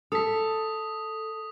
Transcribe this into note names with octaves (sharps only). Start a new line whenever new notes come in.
A4 D#6 B6